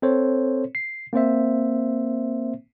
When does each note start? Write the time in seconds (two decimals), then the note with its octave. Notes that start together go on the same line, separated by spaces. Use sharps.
0.02 C4 A4 C5 C#5
0.75 C7
1.13 A#3 C4 C5 E5